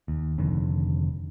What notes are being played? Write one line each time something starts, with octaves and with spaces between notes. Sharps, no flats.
D#2
F1 F2 D3 D#3